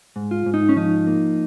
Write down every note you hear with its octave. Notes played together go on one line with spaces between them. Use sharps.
G#2
F4
G#2
D#4
C#4
F3 D#4
A#3